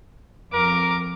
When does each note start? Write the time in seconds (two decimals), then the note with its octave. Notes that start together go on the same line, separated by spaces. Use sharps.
0.54 F2 A#4 D6